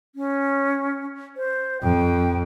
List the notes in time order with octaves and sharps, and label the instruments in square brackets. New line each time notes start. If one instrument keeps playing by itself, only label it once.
[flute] C#4
C5
[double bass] F2 [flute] G5